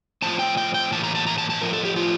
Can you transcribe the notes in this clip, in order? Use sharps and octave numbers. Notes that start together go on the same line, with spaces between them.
A2 F3 C4 A5
G5
G5
G5
A2 E3 A#3 A5
A#5
A5
A#5
A5
A5
A2 F3 A3 A#4
A4
G4
F4